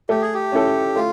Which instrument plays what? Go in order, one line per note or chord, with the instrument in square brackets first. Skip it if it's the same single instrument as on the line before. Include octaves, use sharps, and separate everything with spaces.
[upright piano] A3 [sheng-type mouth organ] G4
[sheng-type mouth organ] G#4
G4
[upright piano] C#4 E4 A4
[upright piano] A3 [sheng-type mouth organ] F4